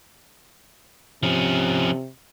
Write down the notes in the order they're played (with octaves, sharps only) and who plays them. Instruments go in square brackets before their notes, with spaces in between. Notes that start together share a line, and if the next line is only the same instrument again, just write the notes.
[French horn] C3 [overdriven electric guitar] F3 C#4